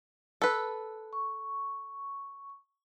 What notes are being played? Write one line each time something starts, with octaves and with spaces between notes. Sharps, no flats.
A4 B4
C#6